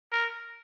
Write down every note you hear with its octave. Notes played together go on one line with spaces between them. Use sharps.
A#4